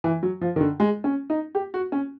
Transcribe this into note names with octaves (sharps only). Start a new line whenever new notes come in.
E3
F#3
F3
D#3
D3
G#3
C#4
D#4
G4
F#4
C#4